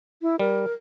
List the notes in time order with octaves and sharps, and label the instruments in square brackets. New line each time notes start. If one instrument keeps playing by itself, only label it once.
[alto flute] E4
[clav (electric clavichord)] G3 [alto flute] A#4